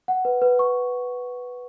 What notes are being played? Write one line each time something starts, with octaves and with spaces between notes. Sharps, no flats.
F#5
B4
B4
C#6